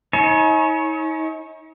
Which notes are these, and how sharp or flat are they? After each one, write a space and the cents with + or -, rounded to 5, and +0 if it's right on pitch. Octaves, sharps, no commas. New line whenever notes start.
D#4 +40 C#5 -20 G#5 +35